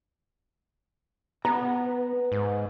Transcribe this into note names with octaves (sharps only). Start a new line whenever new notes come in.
B3 A#5
B4
G#2